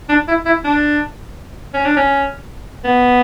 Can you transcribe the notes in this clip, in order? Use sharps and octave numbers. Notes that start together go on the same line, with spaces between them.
D4
E4
E4
D4
C#4
D4
C#4
B3